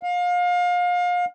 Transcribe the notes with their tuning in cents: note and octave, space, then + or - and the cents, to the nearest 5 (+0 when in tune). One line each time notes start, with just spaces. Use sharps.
F5 +30